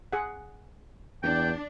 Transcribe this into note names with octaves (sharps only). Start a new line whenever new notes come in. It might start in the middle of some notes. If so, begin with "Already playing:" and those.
G#4 F#5
E2 D4 G5